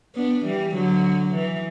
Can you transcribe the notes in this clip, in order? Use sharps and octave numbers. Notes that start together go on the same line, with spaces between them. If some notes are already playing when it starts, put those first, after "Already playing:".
B3 D4
E3 G3
D3 F#3
E3